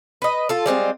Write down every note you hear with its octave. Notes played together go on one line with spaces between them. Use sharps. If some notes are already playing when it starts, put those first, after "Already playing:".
B4 D#5
F4 A4
G3 G#3 C4 F4